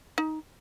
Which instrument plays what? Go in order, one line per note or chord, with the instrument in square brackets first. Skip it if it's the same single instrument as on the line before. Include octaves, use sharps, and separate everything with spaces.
[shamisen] D#4